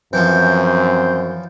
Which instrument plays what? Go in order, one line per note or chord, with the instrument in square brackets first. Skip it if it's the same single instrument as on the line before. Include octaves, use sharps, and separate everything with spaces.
[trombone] F#2 [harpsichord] E3 F3 [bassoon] C4 [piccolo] G6
[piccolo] G6